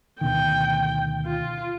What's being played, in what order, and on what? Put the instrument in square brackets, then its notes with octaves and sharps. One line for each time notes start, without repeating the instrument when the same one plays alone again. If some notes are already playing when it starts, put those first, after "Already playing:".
[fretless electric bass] D2 B2 D#3 [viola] G5
[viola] F4